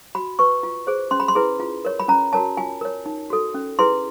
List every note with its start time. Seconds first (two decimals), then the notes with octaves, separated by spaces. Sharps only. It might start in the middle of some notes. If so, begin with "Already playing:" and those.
0.15 F#4 B5
0.39 B4 C#6
0.63 F4
0.87 G#4 C5
1.11 C#4 C6
1.20 B5
1.28 C6
1.35 E4 G#4 B4
1.60 F4
1.85 A#4 C#5
2.00 B5
2.08 C#4 A#5
2.33 F#4 A#4 C#5 A5
2.57 F4 G#5
2.81 A#4 C#5
3.06 D#4
3.30 F#4 A4
3.54 C#4
3.79 E4 G#4 B4 C6